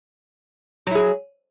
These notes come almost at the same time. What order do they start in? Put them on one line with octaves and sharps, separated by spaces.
F#3 E4 G#4